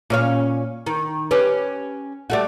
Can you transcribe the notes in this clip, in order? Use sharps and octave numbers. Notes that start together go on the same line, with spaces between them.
A#2 C#4 F5
D#3
C#4 G4 B4
G3 A3 F#4